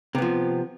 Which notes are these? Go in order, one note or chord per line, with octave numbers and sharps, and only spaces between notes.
C3 F3 B3